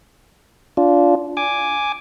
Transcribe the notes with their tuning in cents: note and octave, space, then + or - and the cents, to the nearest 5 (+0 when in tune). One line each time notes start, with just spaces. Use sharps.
D4 -25 F4 +0
G#5 +0 D6 +0